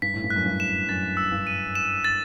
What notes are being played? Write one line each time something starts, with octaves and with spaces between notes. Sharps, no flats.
G2 B6
A2
G2
F#6
F#2
G2
E7
F#2 A6
E6
G2
D#7
E7
A6